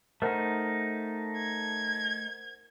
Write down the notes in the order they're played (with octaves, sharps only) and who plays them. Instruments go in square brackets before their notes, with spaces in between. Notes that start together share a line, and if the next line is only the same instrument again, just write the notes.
[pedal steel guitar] A3 D#4 [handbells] A#4 C5 F#5
[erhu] G#6